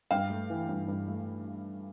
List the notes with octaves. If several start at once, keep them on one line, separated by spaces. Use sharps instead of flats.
G2 F5 G5
A3
E3
G2
G2
A3